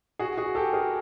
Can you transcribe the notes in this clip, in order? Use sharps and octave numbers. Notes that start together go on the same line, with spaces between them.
F#4 G#4
F#4 G#4
G4 A4
G#4 A#4